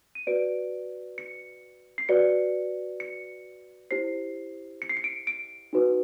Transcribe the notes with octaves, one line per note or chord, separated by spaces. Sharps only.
D#7
F#4 B4 D5 D7
C#7
C7
F#4 B4 D5 C#7
C#7
E4 G4 C5 C7
C#7
C7
C#7
D7
D7
D#4 F#4 B4